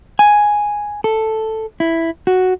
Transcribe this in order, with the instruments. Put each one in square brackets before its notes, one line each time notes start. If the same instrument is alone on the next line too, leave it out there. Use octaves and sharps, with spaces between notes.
[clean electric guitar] G#5
A4
E4
F#4